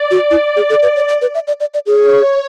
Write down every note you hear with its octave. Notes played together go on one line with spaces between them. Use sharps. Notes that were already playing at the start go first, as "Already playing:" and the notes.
Already playing: D5
F#4
E4
G#4
A4 D5
B4
C#5
D5
B4
E5
D5
D5
D5
G#4 C#5